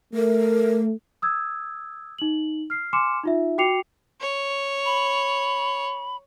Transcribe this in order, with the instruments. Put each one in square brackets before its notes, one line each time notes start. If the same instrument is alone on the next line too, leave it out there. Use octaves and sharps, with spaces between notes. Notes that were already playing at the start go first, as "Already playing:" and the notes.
[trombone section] A3 [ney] A#4
[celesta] D#6 E6 G#6
D#4 F#7
F6 C7
G#5 C6 D6 F6 C#7 E7
D#4 F4 E5
F#4 G5 D6 C7 C#7 F7
[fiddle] C#5
[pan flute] B5